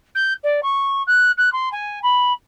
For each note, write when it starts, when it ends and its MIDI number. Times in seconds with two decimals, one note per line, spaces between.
0.15 0.33 91
0.43 0.60 74
0.63 1.02 85
1.07 1.31 90
1.37 1.52 90
1.52 1.69 84
1.72 1.99 80
2.03 2.32 83